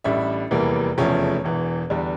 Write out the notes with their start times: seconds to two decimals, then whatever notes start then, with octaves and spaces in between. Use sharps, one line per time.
0.04 A1 A2 G3 D4 E5
0.51 F1 E2 E3 G3 A#3
0.98 F1 E2 C#3 F3 A3 C#5
1.44 E1 E2 E3
1.90 E2 D3 G3 D4